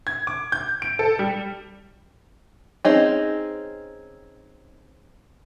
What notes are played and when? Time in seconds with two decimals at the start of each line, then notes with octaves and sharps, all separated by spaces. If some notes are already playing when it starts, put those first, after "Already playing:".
0.07 G#6
0.27 D6
0.52 G6
0.82 D7
0.99 A4
1.19 G3
2.85 C4 C#4 D#4 G#4